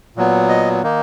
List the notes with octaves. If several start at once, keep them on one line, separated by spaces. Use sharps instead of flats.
A#2 F#3 B3
D#5
D#3 A#3 D#4